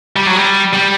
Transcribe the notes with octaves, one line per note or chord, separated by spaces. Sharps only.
G3
F#3
G3
G3